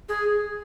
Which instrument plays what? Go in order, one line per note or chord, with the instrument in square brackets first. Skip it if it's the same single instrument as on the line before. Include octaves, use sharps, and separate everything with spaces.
[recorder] G#4